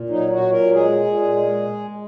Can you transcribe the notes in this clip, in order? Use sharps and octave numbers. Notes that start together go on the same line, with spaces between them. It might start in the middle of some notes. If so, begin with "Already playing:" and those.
Already playing: A#2
F#3 D#4
F#4
A#2
A#4
G#3 G#4
A#2
G#3